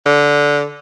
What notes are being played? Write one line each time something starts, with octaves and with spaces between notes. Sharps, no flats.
D3